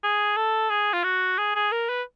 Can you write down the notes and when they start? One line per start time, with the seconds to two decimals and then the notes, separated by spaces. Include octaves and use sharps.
0.03 G#4
0.36 A4
0.70 G#4
0.93 F4
1.04 F#4
1.38 G#4
1.55 G#4
1.72 A#4
1.89 B4